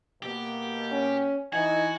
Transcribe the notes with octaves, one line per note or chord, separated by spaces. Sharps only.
B2 A#3 G4
C#4
E3 D#4 F#4 G#5